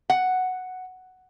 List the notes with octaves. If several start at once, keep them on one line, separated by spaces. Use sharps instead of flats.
F#5